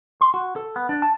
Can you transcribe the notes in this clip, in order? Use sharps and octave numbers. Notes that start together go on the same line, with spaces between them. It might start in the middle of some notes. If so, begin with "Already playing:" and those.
C6
F#4
A4
B3
D4
A5